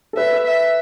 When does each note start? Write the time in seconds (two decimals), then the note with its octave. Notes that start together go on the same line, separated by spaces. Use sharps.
0.13 A4
0.17 B4 E5
0.46 E5